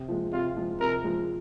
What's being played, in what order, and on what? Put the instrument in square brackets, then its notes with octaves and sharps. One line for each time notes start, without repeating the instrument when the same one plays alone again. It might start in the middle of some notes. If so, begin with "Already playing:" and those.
Already playing: [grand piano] C3
F3 G#3
[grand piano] C3 [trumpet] F4
[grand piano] F3 G#3
[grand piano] C3 [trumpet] A#4
[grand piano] F3 G#3